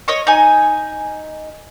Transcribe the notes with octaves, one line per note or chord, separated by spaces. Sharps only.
C#5 D#5 C#6
D#4 G#5